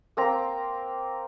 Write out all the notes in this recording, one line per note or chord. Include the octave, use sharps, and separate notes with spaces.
A#3 C4 A#5